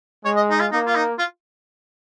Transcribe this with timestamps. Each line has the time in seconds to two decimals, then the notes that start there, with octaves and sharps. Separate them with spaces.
0.25 G#3 C#5
0.37 D#5
0.51 D#4
0.60 F4
0.72 A#3 D#4
0.86 F4
0.96 D#4
1.19 F4